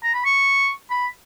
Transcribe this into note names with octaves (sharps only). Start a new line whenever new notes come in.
A#5
B5
C#6
B5